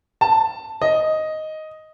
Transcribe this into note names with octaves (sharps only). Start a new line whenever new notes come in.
A5
D#5